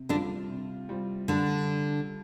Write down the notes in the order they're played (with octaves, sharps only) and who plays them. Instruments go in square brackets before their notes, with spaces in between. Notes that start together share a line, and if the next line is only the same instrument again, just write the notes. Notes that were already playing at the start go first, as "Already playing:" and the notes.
Already playing: [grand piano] C3
[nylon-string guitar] D3 D4 [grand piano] G3 C4 F4
[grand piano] C3
G3 C4 F4
[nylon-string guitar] D3 D4 [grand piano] G3